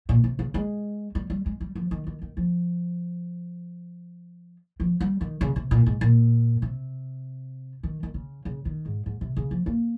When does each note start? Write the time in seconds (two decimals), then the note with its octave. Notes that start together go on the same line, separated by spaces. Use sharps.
0.09 A#2
0.24 C3
0.39 C#3
0.54 G#3
1.15 G3
1.30 G3
1.46 G#3
1.61 G3
1.75 F3
1.91 D#3
2.07 D#3
2.22 D#3
2.37 F3
4.80 F3
5.01 G3
5.21 D#3
5.41 C#3
5.56 C3
5.71 A#2
5.86 G#2
6.01 A#2
6.62 C3
7.83 D#3
8.03 D#3
8.14 C#3
8.45 C#3
8.65 D#3
8.86 G#2
9.06 G#2
9.21 C3
9.37 C#3
9.51 F3
9.66 A#3